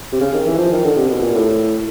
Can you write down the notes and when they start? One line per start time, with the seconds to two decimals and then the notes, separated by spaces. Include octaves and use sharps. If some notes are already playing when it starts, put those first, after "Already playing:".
0.13 C3
0.21 C#3
0.34 D#3
0.46 E3
0.58 F3
0.72 D#3
0.85 D3
0.97 C3
1.09 B2
1.22 A#2
1.34 A2